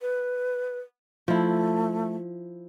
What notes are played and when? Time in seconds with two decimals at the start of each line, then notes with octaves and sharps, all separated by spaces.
0.02 B4
1.28 F3 A3 E4